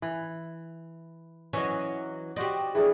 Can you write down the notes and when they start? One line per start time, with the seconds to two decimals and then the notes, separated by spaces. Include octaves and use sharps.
0.02 E3
1.53 E3 F#3 C#4 D#5
2.36 F#4 G4 C5 D5 D#5
2.75 E3 A3 D4 G#4